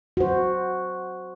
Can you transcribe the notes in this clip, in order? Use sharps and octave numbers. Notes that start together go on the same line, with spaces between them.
F#4 C5